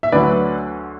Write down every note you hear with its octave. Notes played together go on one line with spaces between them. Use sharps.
E5
D2 D3 F#3 B4 D5